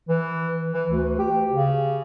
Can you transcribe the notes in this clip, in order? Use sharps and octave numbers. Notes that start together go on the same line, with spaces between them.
E3
E3
D2
G4
C#3